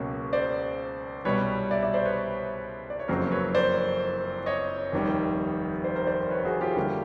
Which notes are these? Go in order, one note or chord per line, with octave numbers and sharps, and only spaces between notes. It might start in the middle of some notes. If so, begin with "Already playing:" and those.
Already playing: C#2 B2 F#3 A#3 C#4
C5 D5
C2 B2 G3 B3 B4 C#5
D5 E5
D5 E5
C5 D5
B4 C#5
D5
C#5
F#1 F2 C#3 F#3 A#3 A#4 C5
B4 C#5
C5 D5
C#5 D#5
F1 D#2 D#3 G3
C5 D5
A#4 C5
C5 D5
B4 C#5
F#4 G#4
F4 G4
D2 D3 G3 A#3